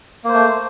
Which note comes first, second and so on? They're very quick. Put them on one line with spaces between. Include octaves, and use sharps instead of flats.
A#3 C5 A3